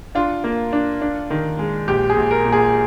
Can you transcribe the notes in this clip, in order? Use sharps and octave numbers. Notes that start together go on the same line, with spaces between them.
D4 F4
A#3
D4
D4
D#3
G#3
A#1 G4
G#4
A#1
A#4
A#2
G#4